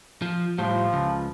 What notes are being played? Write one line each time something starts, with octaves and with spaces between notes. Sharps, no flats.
F3
A2 F3 G3
C#2